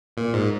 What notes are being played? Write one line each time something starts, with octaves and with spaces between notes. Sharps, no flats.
A#2
G#2